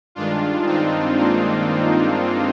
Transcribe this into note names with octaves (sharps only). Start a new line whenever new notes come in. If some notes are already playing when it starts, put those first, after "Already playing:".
G2 D#3 G#3 D4 F4
C4 D#4
A#3 D4